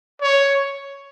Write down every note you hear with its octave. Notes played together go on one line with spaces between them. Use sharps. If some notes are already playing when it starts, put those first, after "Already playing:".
C#5